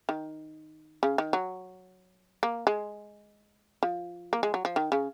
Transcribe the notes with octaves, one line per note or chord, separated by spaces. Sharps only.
D#3
C#3
D#3
F#3
A#3
G#3
F3
A#3
G#3
F#3
F3
D#3
C#3